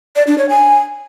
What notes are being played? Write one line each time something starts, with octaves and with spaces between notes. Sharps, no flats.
D5
D4
C#5
G#5